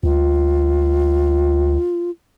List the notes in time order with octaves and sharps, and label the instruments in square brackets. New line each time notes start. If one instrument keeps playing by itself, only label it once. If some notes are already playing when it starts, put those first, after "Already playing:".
[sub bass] D2 [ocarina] F4